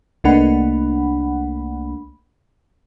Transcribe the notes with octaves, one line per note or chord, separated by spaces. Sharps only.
C2 A3 A#3 D4 F#5 B5